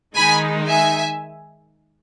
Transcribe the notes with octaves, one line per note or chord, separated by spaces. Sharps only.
D#3 G#3 D#4 G#5 B5
E5 G#5